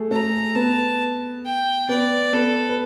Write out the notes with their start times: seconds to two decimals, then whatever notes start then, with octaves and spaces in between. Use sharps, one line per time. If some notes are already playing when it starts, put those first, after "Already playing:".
Already playing: A3 G#4 A4
0.11 A3 A4 A#5
0.55 B3 B4 A5
1.45 G5
1.89 B3 B4 D5
2.33 B3 A4 B4
2.69 B4